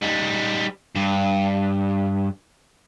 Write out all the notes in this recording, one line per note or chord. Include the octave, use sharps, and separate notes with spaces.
G3 D#4
G2